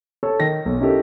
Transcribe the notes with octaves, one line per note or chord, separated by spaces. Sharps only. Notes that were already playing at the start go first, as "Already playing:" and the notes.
A4 C#5 A5
D#3 D#4 A#6
B1
C#4 D#4 E4 G4 A4 A#4